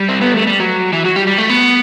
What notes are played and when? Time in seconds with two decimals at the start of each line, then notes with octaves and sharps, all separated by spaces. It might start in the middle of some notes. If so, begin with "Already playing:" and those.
Already playing: G3
0.09 C4
0.21 B3
0.34 A3
0.47 G3
0.60 F#3
0.93 E3
1.06 F#3
1.16 G3
1.27 G3
1.38 A3
1.49 B3